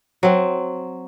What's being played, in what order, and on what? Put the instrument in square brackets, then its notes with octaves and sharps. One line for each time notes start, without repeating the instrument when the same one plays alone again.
[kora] F#3 C4